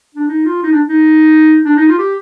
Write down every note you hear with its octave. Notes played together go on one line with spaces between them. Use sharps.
D4
D#4
F4
D#4
D4
D#4
D4
D#4
F4
G4